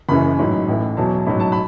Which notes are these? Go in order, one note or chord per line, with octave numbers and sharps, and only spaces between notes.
F#1 F#2 C#3 E3 B5
A1 G#2 F#3
A1 A2 E3
E2 B2 F#3 A5
A1 G#2 F#3 B5
A5
B5